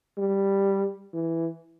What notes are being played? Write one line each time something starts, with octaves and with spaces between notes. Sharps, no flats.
G3
E3